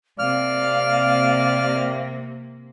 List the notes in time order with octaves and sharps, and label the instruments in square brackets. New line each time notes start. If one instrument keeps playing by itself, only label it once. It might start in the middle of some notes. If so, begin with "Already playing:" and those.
[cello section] C3 A#3 [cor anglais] D5 [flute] F5 [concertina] F6